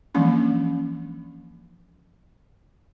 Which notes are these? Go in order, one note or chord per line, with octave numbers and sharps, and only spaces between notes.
E3 F3 G#3 A#3 C#4 D4